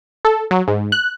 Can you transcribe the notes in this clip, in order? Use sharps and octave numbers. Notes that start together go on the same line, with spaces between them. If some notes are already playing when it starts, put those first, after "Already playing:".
A4
F#3
G#2
F#6